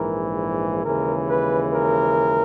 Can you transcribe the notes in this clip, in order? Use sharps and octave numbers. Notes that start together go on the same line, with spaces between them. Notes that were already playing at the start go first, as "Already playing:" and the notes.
Already playing: A#1 G#2 E3 A#4
D#2 C#3 E3 G#3 A#4
B4
A#4